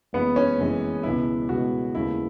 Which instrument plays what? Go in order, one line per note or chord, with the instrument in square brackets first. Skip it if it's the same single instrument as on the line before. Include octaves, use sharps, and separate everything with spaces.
[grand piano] F#1 F#2 E3 G#3 [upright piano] B3
[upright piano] C#4
[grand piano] F#1 F#2 E3 G#3
[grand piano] C#2 B2 G#3 B3 [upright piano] E4
[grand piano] C#2 B2 G#3 B3 [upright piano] F#4
[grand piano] D#2 C#3 G#3 B3 [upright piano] E4